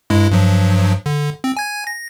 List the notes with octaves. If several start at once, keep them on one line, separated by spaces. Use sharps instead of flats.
G2 G#3 E4
G2 F3 F#3
D3
C4
G#5 G#6
A#6